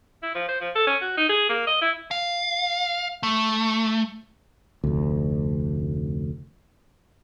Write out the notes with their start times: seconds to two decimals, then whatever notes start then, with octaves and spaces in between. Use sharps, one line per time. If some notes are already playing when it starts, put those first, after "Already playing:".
0.23 E4
0.35 F3
0.48 C5
0.61 F3
0.75 A4
0.87 C#4
1.01 F#4
1.17 D#4
1.29 G#4
1.49 A#3
1.67 D#5
1.81 E4
2.11 F5
3.23 A3
4.84 F1 D2